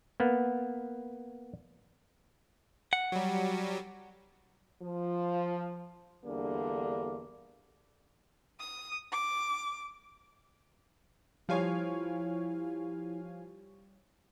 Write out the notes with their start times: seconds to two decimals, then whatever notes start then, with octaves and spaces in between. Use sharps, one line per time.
0.20 A#3 B3
2.93 F#5
3.12 F#3 G3
4.82 F3
6.25 E2 D3 G3 A#3 D4
8.60 D#6
9.12 D6
11.49 F3 G3 E4 C#5 F5 G#5